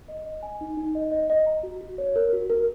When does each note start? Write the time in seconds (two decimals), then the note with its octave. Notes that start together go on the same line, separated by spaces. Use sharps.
0.08 D#5
0.25 D#5
0.42 G#5
0.61 D#4
0.77 D#4
0.95 D#5
1.12 D#5
1.30 D#5
1.46 A#5
1.63 F#4
1.81 F#4
1.98 C#5
2.16 A#4
2.33 F#4
2.50 A#4